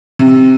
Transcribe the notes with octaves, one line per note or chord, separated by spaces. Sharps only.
C3